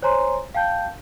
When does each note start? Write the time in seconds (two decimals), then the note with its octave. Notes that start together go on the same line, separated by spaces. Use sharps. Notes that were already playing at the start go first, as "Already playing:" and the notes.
0.02 C5 C#5 G#5 A#5 C6
0.55 F5 G5 A5 G6